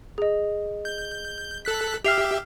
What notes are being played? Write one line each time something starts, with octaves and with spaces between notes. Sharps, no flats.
G#4 D#5
G6
A4 F#6 B6
G4 E5 F6 C7 F7